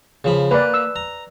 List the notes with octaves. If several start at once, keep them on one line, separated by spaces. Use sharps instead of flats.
C#3 F3 B5
A#3 B4 D5
E6
A#5